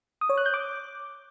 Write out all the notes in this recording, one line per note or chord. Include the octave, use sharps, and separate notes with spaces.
D#6
C#5
F#6
G6
D6